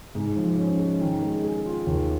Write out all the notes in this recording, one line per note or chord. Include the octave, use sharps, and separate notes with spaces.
G#2
F3
C#4
G#3
D#3
G#3
G#4
F4
D#2